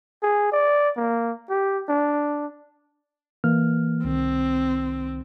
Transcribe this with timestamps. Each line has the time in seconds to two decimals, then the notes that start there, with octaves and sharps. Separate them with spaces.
0.22 G#4
0.52 D5
0.96 A#3
1.49 G4
1.89 D4
3.44 E3 A#3 F6
4.04 C2 D#3 C4